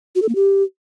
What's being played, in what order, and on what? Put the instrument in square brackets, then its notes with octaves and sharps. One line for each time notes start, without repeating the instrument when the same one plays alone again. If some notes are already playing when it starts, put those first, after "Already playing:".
[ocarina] F#4
A4
A#3
G4